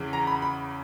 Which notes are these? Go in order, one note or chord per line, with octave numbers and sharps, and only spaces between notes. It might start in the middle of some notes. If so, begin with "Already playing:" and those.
Already playing: E2 C#3 E3
A#5
B5
B5